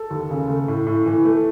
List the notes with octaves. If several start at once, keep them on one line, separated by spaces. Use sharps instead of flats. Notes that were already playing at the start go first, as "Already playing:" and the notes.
Already playing: A4
D#2
C#3
A3
A2
A2
E3
A3